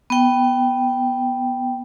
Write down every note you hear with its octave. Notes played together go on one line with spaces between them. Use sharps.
B3 G5